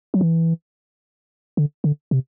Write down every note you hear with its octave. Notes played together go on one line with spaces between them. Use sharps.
F#3
E3
D3
D3
C3